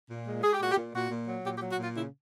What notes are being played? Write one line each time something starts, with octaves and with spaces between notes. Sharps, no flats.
A#2
G#3
G#3 G#4
G4
A#2 F#4
G4
A#2
A#2 F#4
A#2
F#3
A#2 G4
G4
F#3
F#4
A#2 F4
C#3 E4